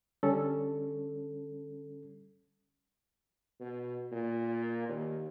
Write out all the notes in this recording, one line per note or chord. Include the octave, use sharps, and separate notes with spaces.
D3 G3 C#4 A4
B2
A#2
D#2